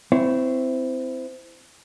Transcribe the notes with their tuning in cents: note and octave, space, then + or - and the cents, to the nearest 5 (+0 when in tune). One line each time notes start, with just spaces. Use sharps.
C4 -20 E4 +0 C#5 +5